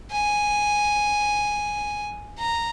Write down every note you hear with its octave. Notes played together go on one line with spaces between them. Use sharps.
G#5
A#5